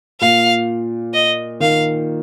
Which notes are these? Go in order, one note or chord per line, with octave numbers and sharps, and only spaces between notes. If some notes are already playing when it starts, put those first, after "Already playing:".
A#2 F5
D#5
D#3 F5